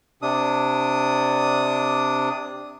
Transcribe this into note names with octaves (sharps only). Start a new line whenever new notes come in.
C3 D4 D#6